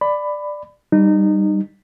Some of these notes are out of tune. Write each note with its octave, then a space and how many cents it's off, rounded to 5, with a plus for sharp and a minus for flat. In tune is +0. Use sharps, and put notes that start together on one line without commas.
D5 +10 B5 +15
G3 +0 D#4 -25